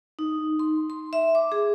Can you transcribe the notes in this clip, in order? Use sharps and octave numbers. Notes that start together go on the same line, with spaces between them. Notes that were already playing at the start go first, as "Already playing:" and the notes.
D#4
C6
C6
E5
D6
G#4